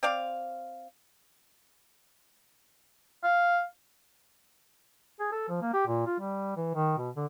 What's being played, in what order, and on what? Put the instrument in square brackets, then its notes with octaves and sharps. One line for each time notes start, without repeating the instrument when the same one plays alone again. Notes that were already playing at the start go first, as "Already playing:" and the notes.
[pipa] C4 D5 F5
[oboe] F5
[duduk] G#4
A4
F3
A#3
G4
A#2
F4
G3
E3
D#3
B2
D3